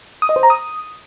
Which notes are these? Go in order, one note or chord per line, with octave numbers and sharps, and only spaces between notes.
D#6
D#5
C5
A#5
D#6